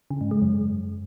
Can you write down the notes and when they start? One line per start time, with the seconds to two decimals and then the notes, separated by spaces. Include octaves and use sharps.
0.10 C#3
0.21 G#2
0.31 G#3
0.42 F#2